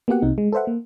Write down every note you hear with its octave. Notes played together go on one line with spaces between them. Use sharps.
A#3 B3 F#4 G4 F#5
C2 C3 D#4
G#3
A4 B4 C5 E5 F#5
A#3